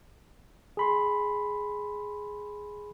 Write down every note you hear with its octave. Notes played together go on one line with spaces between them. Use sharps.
G#4 B5 C6